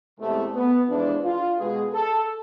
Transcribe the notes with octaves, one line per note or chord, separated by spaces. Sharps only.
E2 C3 G#3 A3
B3
F2 E3 G#3 D4
F4
B2 G#3 G#4
A4